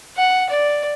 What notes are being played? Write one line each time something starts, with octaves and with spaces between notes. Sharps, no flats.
F#5
D5